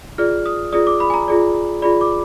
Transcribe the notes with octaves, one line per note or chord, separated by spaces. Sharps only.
F4 G#4 D5 F6
D#6
F4 G#4 D5 D#6
D6
B5
G#5
A#5
F4 G#4 D5
F4 G#4 D5 B5
D6